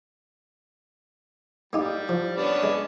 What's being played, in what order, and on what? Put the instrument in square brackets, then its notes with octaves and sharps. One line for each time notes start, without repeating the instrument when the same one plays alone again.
[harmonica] G3 [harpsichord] A#3 D#4 G4
[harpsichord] F3
[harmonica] B3 C#4 D4
[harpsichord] G#3